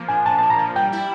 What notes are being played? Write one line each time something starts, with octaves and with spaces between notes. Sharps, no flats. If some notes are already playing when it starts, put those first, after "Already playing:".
Already playing: F3 A#3
D4 G#5
F3 A5
A#3 A5
A#5
F3
G3 G5
E4